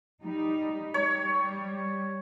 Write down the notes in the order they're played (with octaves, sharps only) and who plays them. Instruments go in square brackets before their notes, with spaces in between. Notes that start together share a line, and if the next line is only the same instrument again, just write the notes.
[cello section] G3 D#4
[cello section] G3 [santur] C#5